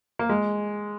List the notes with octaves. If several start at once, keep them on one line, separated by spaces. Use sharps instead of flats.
A#3
G#3